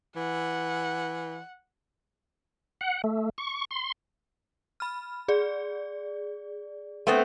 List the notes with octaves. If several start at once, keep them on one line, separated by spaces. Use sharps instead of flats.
E3 F#5
F#5
A3
C#6
C6
B5 F6
G#4 D5
A3 B3 C4